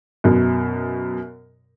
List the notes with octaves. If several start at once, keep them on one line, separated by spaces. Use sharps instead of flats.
F#2 B2